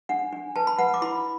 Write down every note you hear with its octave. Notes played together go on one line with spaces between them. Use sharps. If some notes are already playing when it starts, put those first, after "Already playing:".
D4 F#5
D4
B4 A5
B5
B4 F#5
D6
E4 B5